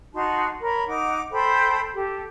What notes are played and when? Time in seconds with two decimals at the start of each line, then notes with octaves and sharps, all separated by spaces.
0.14 D#4 F#4 A5 C6
0.61 A#4 C#5 B5
0.87 D#4 F#5 D6
1.32 A4 C5 G5 B5
1.94 G4 A4